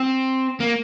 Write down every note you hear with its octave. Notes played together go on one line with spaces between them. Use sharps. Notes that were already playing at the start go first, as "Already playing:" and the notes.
Already playing: C4
A#3